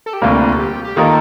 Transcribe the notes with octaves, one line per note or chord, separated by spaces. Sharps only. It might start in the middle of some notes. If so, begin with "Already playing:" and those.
A4
G4
D2 C3 G3 A#3 F4
A4
G4
G4
D#3 A#3 F4 A4 A#4